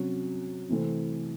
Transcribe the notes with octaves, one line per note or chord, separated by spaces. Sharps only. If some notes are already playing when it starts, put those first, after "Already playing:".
Already playing: C3 F#3 C#4 F#4
C3 E3 A3 C4